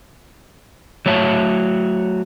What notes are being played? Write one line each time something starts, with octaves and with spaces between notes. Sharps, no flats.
F#3 A3 C#5 E5 A5